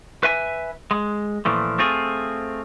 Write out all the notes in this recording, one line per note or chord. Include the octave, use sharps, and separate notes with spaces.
B4 E5 G#5
G#3
A#2 E3 F3 A3
A3 C4 F4 G#4